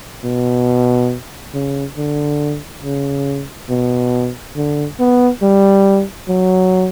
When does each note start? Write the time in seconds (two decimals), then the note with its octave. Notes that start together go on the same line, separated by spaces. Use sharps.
0.24 B2
1.54 C#3
1.97 D3
2.84 C#3
3.70 B2
4.56 D3
4.99 B3
5.42 G3
6.29 F#3